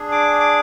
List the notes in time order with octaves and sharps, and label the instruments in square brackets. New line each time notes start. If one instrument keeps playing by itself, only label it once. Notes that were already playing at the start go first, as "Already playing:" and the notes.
Already playing: [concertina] D4 G#4
D6
D6